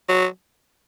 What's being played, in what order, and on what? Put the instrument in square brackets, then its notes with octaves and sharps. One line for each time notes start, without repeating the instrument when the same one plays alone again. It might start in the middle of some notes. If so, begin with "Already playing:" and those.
[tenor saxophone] F#3